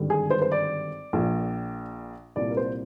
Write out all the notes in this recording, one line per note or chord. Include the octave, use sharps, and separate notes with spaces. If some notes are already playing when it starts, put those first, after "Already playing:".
Already playing: G#1 G2 D3
G#4
C5
C5
D5
A#1 A#2
C2 A#2 D5
A#4
C5